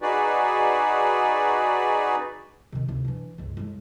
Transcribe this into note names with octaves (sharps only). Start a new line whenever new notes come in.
D#4 F#4 G#4 B4 D5
C3 D#3
D2 C3
E3 D4
G1 C#2
A2 G#3